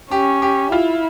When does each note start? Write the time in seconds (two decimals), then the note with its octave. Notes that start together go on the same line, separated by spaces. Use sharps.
0.11 C#4 G4
0.42 G4
0.72 E4 F4